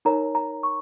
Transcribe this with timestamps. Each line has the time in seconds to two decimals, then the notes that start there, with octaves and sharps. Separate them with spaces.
0.05 D#4 A#4 C#5 A#5
0.35 A#5
0.63 C#6